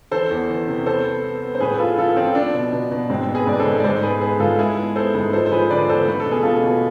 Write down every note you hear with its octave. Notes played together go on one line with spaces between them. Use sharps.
E3 A4 C5
E2
E3
C3
B3 A4 C5
B3
B3
B3
C5
A2 G#4 B4
B4
F3 F4 A4
F3 F4 A4
F3 C4
B3 D4
B2
B2
B2
G#2 C4
B3
G#4 B4
G#2 D5
A4 C5
G#2
D5
G#2 A4 C5
B3 G#4 B4
B3 G#4 B4
G#2 F4 A4
G#3 E4 G#4
B3
B3 A4 C5
G#2
F3 A4 C5
C5
F3 G#4 B4
D3 B4 D5
E2 A4 C5
A3 B4
A4
B2
G#4
B2 F4 A4
B2